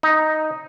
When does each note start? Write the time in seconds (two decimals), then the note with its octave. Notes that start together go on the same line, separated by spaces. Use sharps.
0.03 D#4